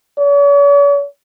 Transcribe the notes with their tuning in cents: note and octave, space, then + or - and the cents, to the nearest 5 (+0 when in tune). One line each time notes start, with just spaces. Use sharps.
C#5 +45